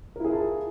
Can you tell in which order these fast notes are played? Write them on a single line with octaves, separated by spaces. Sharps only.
A#4 E4 G#4 F4 A5